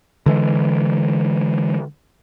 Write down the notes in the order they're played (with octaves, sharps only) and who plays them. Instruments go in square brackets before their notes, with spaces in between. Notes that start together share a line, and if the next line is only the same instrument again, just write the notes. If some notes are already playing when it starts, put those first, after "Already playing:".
[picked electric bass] D3 E3 G#3